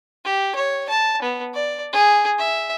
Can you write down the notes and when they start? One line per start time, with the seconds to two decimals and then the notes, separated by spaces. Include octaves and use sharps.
0.25 G4
0.55 C#5
0.89 A5
1.22 B3
1.54 D5
1.93 G#4
2.39 E5